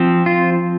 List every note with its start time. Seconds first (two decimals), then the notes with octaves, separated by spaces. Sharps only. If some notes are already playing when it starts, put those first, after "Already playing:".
Already playing: F3 C4
0.26 F4